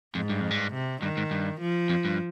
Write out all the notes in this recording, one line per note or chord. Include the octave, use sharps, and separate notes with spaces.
F2 G#2
G2
F2
G2
C3
G2 D#3
G#2
G2
F3
F2
G2